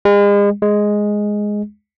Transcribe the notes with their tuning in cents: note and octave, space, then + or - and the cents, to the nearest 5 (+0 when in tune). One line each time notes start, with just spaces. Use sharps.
G#3 -40
G#3 +0